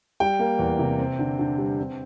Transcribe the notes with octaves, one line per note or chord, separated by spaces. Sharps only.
G3 G5
A#3
E2
C3
C4
D3
D3
G3
C4